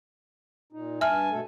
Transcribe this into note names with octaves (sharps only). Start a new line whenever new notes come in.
A#2 D#4
G2 E5 G#5 A5 F6
B2 A3 A4